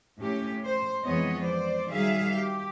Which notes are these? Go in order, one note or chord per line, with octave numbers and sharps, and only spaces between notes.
A2 C#4 G4
C5
F2 E3 G#3 B3 C#5 D#5
C5 D5
D#3 F#3 G3 G#4 E5 F5
G4